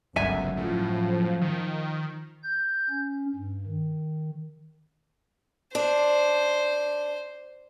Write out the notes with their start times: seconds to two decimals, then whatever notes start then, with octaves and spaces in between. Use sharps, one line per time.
0.16 G1 C#2 F#2 E5 G#5
0.57 A2 F3
1.42 D#3
2.44 G6
2.90 C#4
3.35 G2
3.66 D#3
5.75 D4 C5